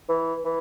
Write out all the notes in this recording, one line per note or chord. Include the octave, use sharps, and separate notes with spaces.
E3
E3